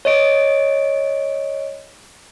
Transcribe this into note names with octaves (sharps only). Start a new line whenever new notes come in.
C#5 D#5 D7